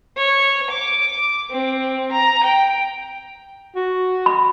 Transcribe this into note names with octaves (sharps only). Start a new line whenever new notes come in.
C#5
D6
C4
A#5
G5
F#4
B5